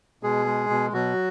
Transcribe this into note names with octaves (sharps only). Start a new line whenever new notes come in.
B2 G#3 G#4
G#3
B2
B2 F#3 F#4